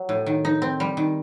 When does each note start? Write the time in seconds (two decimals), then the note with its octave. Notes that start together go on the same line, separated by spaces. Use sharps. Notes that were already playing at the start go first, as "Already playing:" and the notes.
Already playing: F#3
0.09 A2
0.26 D#3
0.45 D#4
0.62 C4
0.80 G3
0.97 D#3